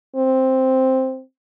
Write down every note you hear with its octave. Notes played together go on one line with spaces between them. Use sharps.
C4